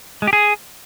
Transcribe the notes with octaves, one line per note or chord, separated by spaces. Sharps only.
G#3
G4
G#4